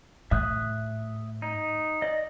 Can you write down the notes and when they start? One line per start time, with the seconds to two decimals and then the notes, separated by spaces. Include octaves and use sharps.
0.31 A2 E5 D#6 F#6
1.42 D#4
2.02 D5 D#5